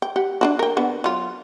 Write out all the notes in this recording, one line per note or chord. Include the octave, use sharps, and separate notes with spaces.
G5
G4 F#5
D4 E4 F#4
A#4 G5
D3 B3
F#3 F4